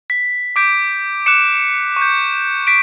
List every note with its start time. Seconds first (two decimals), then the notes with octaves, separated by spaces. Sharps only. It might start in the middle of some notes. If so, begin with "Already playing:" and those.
0.10 B6
0.56 D6 G6 B6 D7
1.26 D6 F#6 C#7 E7
1.96 C#6
2.02 G6
2.67 B6 D7